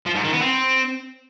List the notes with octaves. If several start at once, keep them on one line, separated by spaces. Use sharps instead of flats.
F3
G#2
D#3
B3
C4